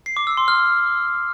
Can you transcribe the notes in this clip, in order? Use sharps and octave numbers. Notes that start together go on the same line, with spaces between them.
C7
D6
E6
C6
F6